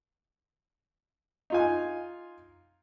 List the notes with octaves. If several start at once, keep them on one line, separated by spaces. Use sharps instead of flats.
D#4 F4 G#5